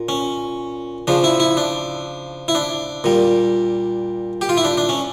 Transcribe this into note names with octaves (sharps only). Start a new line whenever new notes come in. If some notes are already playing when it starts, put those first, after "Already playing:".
Already playing: A#2
C#4
C#3 F3 D4
E4
E4
D4
E4
D4
A#2 G3
G4
F4
E4
D4
D4
C#4